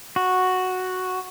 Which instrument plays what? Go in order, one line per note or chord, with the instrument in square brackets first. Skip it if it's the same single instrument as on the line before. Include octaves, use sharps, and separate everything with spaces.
[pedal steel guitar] F#4